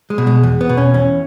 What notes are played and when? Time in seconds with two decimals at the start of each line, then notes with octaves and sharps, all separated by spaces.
0.10 G#3
0.18 B2
0.27 G#3
0.43 E2
0.61 B3
0.69 B2
0.77 C#4
0.94 E2 C#4